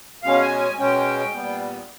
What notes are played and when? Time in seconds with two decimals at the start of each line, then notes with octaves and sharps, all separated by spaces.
0.23 B2 G#3 C#4 F5
0.41 G#5
0.59 G#5
0.79 B2 G#3 C#4 G5
1.34 A#2 G3 B3